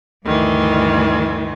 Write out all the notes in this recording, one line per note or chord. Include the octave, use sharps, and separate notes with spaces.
D2 G2 D#3 E3